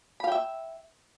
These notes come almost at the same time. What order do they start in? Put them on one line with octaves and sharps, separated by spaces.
B5 F5 G5 E5